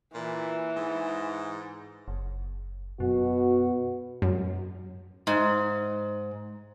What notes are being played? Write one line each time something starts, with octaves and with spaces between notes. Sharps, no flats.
A#2 E3
G#2
F#1
F#2 B2 F#4
F#2
G#2